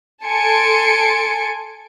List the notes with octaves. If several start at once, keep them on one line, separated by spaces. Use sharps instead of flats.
A4 G#5 A5 C6 C#7 D7